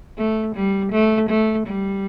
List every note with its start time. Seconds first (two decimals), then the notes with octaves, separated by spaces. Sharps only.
0.18 A3
0.55 G3
0.92 A3
1.29 A3
1.67 G3